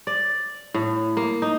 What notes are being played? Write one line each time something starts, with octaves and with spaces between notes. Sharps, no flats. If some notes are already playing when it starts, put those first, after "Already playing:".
D5
A2
A#3
D#4